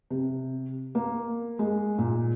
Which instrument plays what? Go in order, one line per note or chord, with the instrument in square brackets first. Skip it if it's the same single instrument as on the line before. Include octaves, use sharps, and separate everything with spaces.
[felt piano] C3
A#3
G#3
A#2